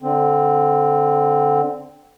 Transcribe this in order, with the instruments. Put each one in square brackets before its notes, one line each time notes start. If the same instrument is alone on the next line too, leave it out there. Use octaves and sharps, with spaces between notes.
[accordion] D3 C4